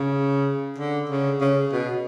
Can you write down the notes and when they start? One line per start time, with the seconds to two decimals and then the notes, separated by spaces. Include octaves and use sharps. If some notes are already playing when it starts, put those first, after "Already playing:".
Already playing: C#3
0.78 D3
1.09 C#3
1.41 C#3
1.72 B2